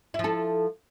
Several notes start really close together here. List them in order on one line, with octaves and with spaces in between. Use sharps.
E4 F3 A4